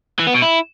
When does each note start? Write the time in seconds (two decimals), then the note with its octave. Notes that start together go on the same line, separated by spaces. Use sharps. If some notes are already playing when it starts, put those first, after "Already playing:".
0.19 E3
0.27 B3
0.34 B2
0.42 E4